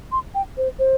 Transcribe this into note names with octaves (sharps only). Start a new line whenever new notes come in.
C6
G5
C5
C5